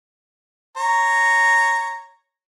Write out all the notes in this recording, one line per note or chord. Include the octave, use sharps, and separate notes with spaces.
C#5 A#5